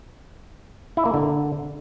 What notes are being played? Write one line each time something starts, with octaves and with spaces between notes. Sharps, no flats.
E4
A#3
D3